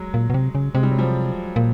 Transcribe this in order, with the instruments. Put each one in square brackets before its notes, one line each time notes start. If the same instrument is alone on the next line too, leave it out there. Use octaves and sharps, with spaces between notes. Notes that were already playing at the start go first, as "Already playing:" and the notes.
Already playing: [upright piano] F#3 G#3
[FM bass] A#2
B2
C3
C#3
[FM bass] C3 [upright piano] G#3
[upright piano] G3
F#3
F3 G3
[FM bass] A#2